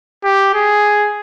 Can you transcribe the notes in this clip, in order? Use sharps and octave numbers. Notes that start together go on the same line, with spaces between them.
G4
G#4